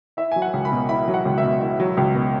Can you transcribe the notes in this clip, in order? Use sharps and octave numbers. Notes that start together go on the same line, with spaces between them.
E4 E5
F#3 G#5
F#5
C#2
B5
B2
E4 B5
F#3
F#5
C#2
E5
B2
E4
F#3
C#2
B2